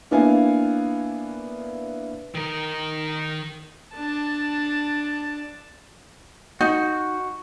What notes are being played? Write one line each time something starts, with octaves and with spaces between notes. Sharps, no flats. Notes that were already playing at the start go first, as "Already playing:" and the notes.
A#3 B3 D4 E4 F5 G#5
D#3 A#4
D4 A5
D#4 F#4